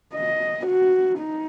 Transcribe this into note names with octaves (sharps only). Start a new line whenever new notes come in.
D#5
F#4
D#4